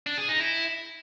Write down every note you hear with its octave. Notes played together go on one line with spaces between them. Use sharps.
D4
G#4
D#4
E4